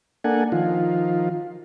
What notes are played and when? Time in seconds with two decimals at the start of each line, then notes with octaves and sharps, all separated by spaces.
0.24 A#3 D4 A4 F#5 G#5
0.52 D#3 F3 F4